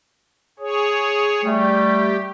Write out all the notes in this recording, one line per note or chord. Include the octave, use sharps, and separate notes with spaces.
G#4 C#5
G3 A3 G4